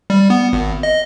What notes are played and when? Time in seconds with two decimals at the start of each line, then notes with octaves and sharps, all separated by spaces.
0.10 G3
0.30 B3
0.53 G#1
0.83 D#5